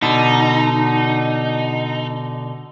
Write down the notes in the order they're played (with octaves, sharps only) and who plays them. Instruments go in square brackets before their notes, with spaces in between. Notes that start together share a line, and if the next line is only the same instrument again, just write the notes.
[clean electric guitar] B2 D3 [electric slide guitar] D#4